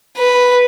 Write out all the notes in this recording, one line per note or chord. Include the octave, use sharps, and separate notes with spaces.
B4